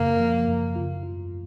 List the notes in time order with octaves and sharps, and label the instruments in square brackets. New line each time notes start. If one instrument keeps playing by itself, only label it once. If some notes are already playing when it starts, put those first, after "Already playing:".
Already playing: [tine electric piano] F#2 C#3 [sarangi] A#3
[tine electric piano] F3
F#2
F4
F4